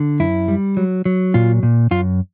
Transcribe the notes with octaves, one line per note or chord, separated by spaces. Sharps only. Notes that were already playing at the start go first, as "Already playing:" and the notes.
Already playing: D3
F#2 E4
G3
F#3
F#3
A#2 F4
A#2
F#2 F4